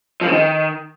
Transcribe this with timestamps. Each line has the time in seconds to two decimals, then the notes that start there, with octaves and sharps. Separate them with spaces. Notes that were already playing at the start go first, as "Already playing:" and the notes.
0.21 F3
0.27 C#3
0.32 D#3